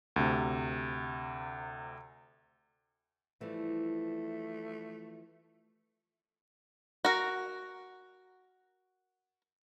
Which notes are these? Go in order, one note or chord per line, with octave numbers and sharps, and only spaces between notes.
D2 C3
E3 F3 G3 A3
F#4 A#4